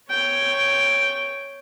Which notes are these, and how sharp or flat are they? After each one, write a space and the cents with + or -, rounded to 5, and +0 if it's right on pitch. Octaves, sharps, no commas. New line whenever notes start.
C#5 +0 G5 +0